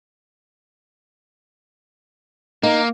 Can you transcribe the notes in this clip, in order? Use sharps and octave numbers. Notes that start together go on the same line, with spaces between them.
A#3 D#4